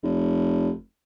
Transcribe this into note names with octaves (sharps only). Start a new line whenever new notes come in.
F1